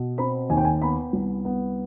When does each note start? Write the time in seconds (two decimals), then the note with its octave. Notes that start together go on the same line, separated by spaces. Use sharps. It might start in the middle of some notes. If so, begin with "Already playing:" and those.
Already playing: B2
0.18 C4 B5
0.50 D#2 G#5
0.57 G5
0.65 G#5
0.82 B3 B5
1.13 C2
1.45 B3